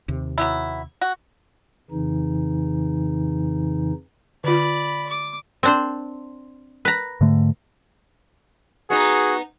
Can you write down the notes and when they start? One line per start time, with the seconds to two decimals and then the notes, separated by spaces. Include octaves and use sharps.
0.08 D#2 C3
0.38 F#3 B3 E4
1.01 F#4
1.91 F2 C#3 E3 D#4
4.44 D3 F4 D5 B5
5.10 D6
5.63 C4 D4 C5
6.85 B4 A#5
7.21 G#2 D3 A3
8.90 B3 D#4 F#4 G#4